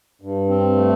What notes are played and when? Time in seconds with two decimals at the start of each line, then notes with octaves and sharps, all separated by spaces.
0.21 G2
0.49 C4
0.76 A3